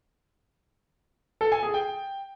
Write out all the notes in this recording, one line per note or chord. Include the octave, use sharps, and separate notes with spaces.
A4
G#5
G#4
G5